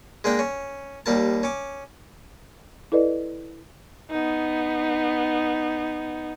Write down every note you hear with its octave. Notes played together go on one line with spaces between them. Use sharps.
G#3 A#3 D4 G5
C#4
D#2 G3 A#3 A5
C#4 D6
E4 A4 B4 D5 D#5
B3 D#4